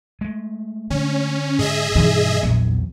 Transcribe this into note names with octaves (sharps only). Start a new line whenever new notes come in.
G#3 A3
D3 C#4
G#2 G#4 D#5 E5
G2 B2 E3 D#4
A#1 E2 F#3 B3